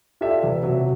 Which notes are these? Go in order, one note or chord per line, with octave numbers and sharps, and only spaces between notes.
F4 G4 A4 D5 E5
E1
C3 F#3